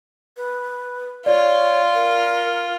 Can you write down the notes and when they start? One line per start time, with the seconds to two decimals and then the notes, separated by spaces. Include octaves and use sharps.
0.37 B4
1.26 F4 C#5 D5
1.95 A#4